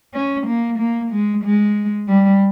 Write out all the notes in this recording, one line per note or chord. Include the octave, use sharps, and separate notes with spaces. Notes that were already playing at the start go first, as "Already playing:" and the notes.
C#4
A#3
A#3
G#3
G#3
G3